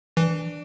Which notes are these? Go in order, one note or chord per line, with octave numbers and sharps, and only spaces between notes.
E3 D4